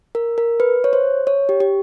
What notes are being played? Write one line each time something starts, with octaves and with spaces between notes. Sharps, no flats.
A#4
A#4
B4
C#5
C5
C#5
G4
G4